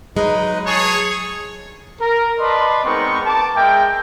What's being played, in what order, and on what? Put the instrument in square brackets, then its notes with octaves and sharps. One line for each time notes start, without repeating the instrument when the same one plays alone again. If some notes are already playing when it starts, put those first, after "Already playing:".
[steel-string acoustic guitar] F#3 G#3 [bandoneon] D#4 B4 D#5
[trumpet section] G#4 C#5 [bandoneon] A5
[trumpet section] A#4
B4 D5 D#5 A5 C6
G#3 B3 C4 D#4 A#4 C#6
A5 D6
G#3 A#4 E5 G5